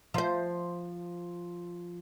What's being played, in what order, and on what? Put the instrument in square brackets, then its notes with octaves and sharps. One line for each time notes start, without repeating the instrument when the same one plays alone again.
[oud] F3 C5